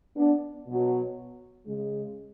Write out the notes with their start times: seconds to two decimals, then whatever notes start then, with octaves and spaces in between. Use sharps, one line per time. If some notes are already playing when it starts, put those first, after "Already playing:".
0.16 B3 D4
0.67 B2 F#3
1.67 C#3 G#3